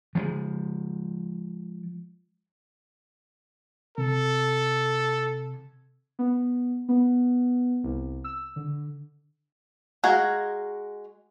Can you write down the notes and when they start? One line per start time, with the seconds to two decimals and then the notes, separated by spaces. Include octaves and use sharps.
0.15 F3 G#3
3.98 C3 A4
6.19 B3
6.89 B3
7.84 C2
8.24 E6
8.56 D3
10.04 G#3 F#4 F5 A#5